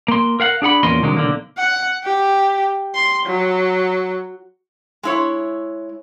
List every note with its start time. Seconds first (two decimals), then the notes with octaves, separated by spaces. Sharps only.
0.08 A#3 C6
0.40 A#4 F5 F#5
0.62 D4 G#4 F#5 B5
0.83 E2 A#2 A#3 C#4 D#5 C6
1.02 C2 D3 D#3 F#3 G#3
1.17 B1 D3 A#3
1.58 F#5
2.04 G4
2.95 C6
3.26 F#3
5.03 G#3 E4 C#5